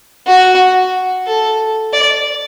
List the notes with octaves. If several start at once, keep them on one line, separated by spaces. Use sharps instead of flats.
F#4
A4
D5